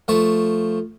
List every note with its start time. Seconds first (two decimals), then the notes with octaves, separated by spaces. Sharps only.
0.08 F3 A3 C#6